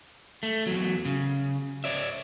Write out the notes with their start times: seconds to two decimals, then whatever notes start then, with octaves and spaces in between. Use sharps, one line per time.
0.43 A3
0.67 E2 F#3
1.05 C#3
1.84 C#5 D5 E5